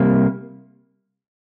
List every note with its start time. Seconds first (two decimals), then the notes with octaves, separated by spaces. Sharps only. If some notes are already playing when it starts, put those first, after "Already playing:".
Already playing: C3 G3 A#3